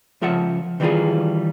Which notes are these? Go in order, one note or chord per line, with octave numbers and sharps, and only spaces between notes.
C#2 F3 F4 E5 F#5
D#3 E3 G3 D#4 F4 G#4